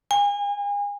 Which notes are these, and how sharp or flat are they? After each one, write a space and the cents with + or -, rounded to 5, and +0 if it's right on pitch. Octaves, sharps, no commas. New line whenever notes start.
G#5 -35